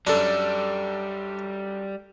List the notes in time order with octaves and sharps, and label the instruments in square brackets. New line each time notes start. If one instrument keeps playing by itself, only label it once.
[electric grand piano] F#2 A4 [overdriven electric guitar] G3 [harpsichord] D4